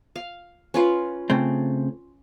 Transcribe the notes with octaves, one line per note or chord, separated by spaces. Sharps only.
F5
C#4 F4 B4
C#3 A3 C4